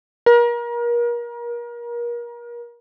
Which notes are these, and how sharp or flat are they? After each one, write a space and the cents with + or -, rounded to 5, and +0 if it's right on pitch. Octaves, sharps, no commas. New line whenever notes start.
A#4 +35